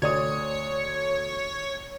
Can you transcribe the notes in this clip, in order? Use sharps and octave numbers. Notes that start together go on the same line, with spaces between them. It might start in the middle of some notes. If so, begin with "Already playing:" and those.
D2 C#5 D5 D#6